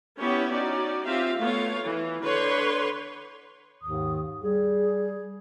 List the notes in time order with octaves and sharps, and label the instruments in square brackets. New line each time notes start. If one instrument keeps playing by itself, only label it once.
[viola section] B3 C#4 E4 G4 C#5
C#4 D#4 F#4 D5
C4 F4 G4 E5 F5
A3 B3 F4 C#5 F5
E3
D3 B4 C#5 C6
[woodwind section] D#2 G#2 D#3 D#6
G3 G#4